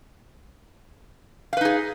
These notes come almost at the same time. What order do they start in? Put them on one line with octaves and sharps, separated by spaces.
F5 B4 D#4 G#4